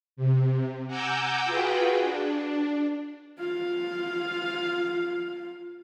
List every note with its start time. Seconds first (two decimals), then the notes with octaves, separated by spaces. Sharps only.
0.16 C3
0.87 F#5 G#5 A#5 D6 E6 G6
1.45 F4 F#4 G#4 B4 G5
2.00 D4
3.39 F4 F5